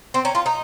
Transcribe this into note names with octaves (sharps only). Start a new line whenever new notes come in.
C4 C6
C#4 A#5
F4 C6
D#4 A#5